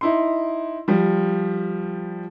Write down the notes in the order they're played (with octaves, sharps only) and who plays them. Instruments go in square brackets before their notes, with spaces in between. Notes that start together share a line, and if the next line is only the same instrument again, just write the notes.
[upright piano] D#4 E4 C6
F3 G3